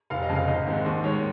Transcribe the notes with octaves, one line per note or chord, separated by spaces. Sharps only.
F1 F5
D#5
F2 C#3
F5
G#1 D#5
G#2 D#3 G#3 C4
D#2 C5
D#3 G#3 C#5